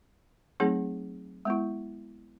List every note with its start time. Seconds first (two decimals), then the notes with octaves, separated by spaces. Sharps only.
0.60 F#3 A3 C4 D#4 G#4
1.45 G#3 B3 E4